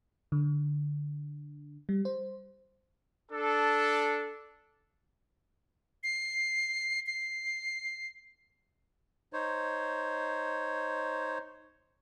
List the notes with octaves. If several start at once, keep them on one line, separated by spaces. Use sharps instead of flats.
D3
G3
C5
D4 A4
C7
C7
D#4 C5 C#5